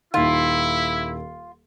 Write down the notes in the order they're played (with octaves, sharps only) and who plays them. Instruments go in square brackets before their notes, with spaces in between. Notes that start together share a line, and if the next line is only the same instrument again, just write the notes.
[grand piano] D#1 D#3 [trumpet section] E4 [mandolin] F4